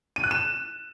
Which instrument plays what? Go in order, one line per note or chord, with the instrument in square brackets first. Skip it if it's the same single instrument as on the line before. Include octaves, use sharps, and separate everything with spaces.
[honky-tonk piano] D#7
F#6
E7